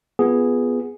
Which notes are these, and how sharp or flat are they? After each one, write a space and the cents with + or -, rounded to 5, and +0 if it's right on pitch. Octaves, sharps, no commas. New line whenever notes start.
B3 +0 F4 +0 G#4 +0